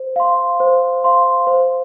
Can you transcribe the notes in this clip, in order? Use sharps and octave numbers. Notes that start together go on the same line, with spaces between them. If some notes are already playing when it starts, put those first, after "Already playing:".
Already playing: C5
F5 C6
C5
F5 C6
C5